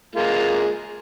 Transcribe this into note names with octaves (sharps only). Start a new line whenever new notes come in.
G#3 A#3 F4